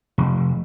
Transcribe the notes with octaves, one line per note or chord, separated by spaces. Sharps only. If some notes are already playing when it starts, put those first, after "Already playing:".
F1